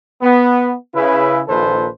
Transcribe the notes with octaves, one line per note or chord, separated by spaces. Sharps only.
B3
C#3 E4 B4
A#1 A#2 D#3 A4 B4 C5